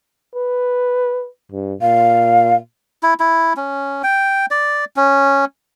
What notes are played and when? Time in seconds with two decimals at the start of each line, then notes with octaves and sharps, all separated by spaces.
0.35 B4
1.52 G2
1.81 A#2 F5
3.03 E4
3.20 E4
3.57 C#4
4.04 G5
4.51 D5
4.96 C#4